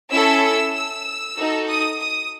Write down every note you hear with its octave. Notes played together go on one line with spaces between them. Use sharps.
C#4 E4 A4 E6
E6
E6
D#4 F#4 A4
D#6
D#6